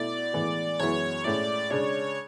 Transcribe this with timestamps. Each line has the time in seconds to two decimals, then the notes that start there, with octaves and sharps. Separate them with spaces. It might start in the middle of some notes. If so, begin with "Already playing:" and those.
Already playing: B2 A3 E4 D5
0.33 A2 E3 G#3 B3
0.79 F#2 E3 G#3 B3 E4 C#5
1.24 A2 G#3 C#4 E4 D5
1.70 C#3 G#3 D4 C#5